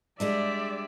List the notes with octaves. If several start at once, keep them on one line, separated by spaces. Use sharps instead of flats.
G3 G#3 D4 D5 E5